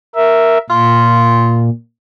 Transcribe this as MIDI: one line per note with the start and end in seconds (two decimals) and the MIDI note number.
0.16 0.58 70
0.16 0.58 76
0.70 1.70 46
0.70 1.66 65